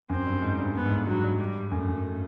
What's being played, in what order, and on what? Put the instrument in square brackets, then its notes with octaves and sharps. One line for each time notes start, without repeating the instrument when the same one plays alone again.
[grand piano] F#2 [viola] C4
[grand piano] G2
G#2
G2
[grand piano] G2 [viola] B3
[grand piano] G#2
G2
[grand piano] G2 [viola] F#3
[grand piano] G2
[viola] G3
[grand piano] F#2 [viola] A3
[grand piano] F#2